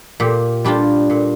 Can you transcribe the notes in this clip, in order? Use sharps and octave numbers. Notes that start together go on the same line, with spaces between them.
A#2 G4
G3 D4 F4 G4
A#2